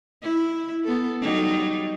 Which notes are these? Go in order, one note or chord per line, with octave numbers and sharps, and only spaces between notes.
E4
B3 A4
F#3 G3 D#4